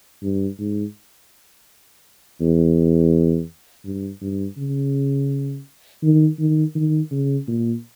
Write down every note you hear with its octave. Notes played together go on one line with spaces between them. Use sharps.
G2
G#2
E2
G2
G2
C#3
D#3
D#3
D#3
C#3
A#2